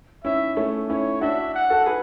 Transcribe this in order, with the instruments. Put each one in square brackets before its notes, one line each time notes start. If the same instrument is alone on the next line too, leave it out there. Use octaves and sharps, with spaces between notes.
[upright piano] C#4 E4 [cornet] E5
[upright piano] A3 C#4
[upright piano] C#4 E4 [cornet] C#5
[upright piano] D4 F#4 [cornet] E5
[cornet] F#5
[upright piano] F#4 A4
G#4 B4